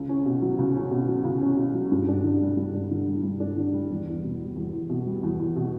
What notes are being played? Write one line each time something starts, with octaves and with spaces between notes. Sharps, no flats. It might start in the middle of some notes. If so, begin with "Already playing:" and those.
Already playing: C#2
C#4
B2
F#3
C#2
C#4
B2
F#3
C#2
C#4
B2
F#3
G2
D4
D3
G3
G2
D4
D3
G3
G2
D4
D3
G3
E2
E2
B2
G3
E2
E2
B2
G3
E2
E2
B2